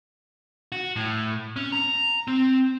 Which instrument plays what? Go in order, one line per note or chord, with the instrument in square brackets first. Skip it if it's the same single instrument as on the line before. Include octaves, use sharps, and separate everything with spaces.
[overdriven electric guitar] F#4
A2
C#4
A#5
C4